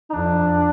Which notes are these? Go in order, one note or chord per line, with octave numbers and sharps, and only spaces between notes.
D#4
F2 D4